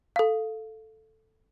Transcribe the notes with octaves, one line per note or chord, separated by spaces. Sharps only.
A4 F5